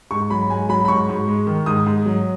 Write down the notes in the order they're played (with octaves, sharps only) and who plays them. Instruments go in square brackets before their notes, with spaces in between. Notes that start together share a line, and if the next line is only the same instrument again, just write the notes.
[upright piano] G#2 C#6
F#3 B5
G#2 G#5
F#3 B5
B5
G#2 C#6
G#2
G#3
D#3
G#2 D#6
G#2
F#3